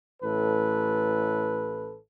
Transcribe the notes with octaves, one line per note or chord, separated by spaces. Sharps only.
A1 A2 A4 B4